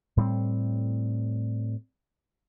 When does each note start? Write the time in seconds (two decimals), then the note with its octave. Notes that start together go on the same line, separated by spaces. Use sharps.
0.17 A2 G3 B3 C4